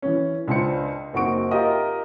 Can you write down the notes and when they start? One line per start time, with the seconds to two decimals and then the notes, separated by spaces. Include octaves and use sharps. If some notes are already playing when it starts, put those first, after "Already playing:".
0.02 E3 C#4
0.48 C#2 D4 C5 C#7
1.13 F#1 C4 D#4 F#4 C#6 D7
1.51 F4 G4 A#4 D#5 E5 D#6